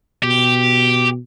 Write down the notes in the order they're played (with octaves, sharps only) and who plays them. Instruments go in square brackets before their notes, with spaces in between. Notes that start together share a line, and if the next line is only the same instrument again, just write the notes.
[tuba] B2 [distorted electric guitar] G4